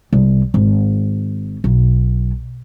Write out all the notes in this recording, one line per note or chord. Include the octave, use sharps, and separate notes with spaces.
C2
G#1
B1